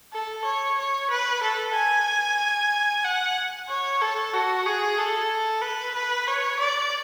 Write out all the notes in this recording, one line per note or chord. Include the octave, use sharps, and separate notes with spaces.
A4
C#5
C#5
B4
A4
G#5
F#5
C#5
A4
F#4
G#4
A4
B4
B4
C#5
D5